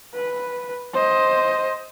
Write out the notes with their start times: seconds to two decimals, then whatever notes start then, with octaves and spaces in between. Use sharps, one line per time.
0.14 B4
0.94 C5 D#5